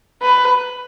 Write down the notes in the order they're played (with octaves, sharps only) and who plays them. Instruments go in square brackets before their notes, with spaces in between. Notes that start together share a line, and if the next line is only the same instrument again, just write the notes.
[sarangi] B4